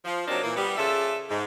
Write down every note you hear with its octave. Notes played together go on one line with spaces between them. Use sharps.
F3
C3 F#3 A#3 C4 D4 D#4
A#2 E3 A#3
G3 B3
C#3 F4 A4 D5 E5
G#2